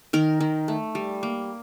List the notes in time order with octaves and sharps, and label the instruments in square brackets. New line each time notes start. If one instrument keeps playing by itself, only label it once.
[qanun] D#3 A#4
D#3
A3
G3
A#3